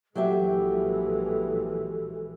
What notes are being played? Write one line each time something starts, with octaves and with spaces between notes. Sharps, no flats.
A#1 E3 F#3 G#3 G4 A4 E5